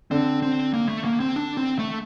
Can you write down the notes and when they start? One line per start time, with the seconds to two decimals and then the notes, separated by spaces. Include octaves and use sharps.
0.11 D3 C4
0.42 C4
0.73 A#3
0.89 A3
1.05 A#3
1.20 C4
1.36 D4
1.57 C4
1.79 A3